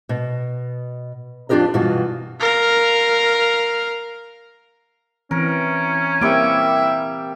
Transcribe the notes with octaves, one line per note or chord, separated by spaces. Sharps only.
B2
F2 D4 F4 G4 A#4 D#5
G2 B2 E3 F4 F#4
A#4 F5
E3 C4 C#4 A#4
G3 A#3 C4 E4 G4 E5 D6